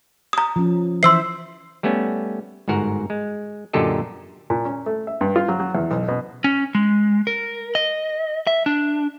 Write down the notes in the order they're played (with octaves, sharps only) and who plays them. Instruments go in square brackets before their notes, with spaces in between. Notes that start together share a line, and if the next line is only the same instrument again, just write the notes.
[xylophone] A#5 D#6
[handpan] F3 C#4
[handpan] E3 C5 E5 [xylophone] C6 E6 C7
[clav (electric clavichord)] G3 A3 B3 C#4
G1 G#2 F#4 A#4 F#5
G#3
F#2 A#2 D3 G4 A4 D#5
[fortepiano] A#2
C#4
A3
E5
G2
F4
F#3
F#3
E2
B1
B2
[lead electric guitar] C#4
G#3
A#4
D#5
E5
D4